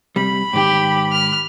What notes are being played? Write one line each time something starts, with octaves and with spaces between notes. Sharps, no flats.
C3 G3 B5
G#2 D#3 G4 G5
F6